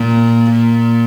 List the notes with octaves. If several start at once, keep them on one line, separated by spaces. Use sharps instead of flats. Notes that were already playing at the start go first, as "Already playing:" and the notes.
Already playing: A#2
A#2